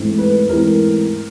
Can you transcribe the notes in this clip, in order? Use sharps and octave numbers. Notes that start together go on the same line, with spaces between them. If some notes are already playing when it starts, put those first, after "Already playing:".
Already playing: G#2 E3 A3 C4
B4
G#2 E3 A3 C4 A#4